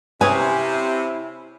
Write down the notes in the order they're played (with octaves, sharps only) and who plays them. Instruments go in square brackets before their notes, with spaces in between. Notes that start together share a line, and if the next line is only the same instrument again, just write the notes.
[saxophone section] C3 [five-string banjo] C#4 G#4 B4 [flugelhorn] E4 [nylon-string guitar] G#5